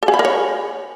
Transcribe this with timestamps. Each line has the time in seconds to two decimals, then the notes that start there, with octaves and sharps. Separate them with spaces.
0.03 A4
0.08 G#4
0.14 B5
0.19 A#4
0.25 C#5